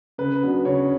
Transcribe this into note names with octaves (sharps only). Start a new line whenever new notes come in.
C#3 B4
F#3 B3 D4
C#3 C#5